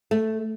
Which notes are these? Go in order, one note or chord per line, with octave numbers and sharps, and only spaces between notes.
A3